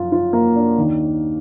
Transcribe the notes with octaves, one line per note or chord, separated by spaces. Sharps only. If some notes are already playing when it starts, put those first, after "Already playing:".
Already playing: F#2 F3 F4
F4
A#3
D4
D#2 D#3